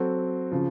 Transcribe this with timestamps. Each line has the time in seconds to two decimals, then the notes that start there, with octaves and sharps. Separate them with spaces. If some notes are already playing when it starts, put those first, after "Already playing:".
Already playing: F#3 C4 F#4 A4
0.52 C#3 F3